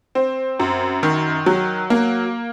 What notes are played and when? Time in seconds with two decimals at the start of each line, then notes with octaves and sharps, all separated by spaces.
0.15 C4
0.60 F#2
1.03 D#3
1.46 F#3
1.90 A#3